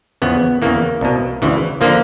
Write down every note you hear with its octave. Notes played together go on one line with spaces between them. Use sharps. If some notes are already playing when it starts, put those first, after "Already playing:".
E2 C#3 F3 B3
E2 C#3 E3 A#3
C2 B2
D2 C#3 E3
D3 F3 A#3